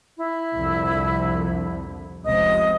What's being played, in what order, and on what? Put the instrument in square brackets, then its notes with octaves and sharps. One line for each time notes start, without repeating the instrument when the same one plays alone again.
[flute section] E4
[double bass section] C2 F2 D3
[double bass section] F1 C#2 C3 [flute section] D#5 D#6